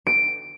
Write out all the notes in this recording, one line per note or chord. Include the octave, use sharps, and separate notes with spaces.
D7